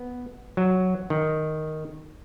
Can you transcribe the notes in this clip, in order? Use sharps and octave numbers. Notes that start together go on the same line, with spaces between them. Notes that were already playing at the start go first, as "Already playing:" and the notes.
Already playing: B3
F#3
D#3